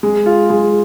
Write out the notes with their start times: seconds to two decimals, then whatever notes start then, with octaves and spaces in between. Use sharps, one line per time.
0.03 G#3
0.26 F4
0.50 G#3